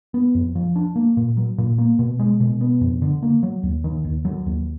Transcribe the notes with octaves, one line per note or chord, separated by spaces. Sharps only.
B3
F2
F3
D4
A#3
A#2
F#3
A#2
A#3
B2
G#3
B2
B3
F2
D3
A#3
F#3
D#2
D#3
D#2
F#3
D#2